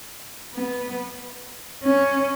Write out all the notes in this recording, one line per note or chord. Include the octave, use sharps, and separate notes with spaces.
B3
C#4